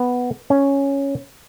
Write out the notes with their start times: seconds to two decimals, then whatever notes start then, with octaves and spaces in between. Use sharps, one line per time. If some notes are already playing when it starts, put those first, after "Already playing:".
Already playing: B3
0.50 C#4